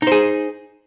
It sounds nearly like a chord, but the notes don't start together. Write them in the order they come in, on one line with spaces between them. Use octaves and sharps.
D#4 C5 G#4